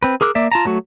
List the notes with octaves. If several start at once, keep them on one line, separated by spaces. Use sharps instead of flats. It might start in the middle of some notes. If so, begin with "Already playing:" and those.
C4 B4
G#4 A#4 D6 E6 F#6
A#3 D5 E5
F4 A5 A#5
F#3 A3 F#4